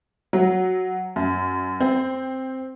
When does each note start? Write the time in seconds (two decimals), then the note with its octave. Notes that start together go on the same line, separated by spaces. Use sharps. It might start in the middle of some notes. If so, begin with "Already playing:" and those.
0.33 F#3
1.16 F#2
1.80 C4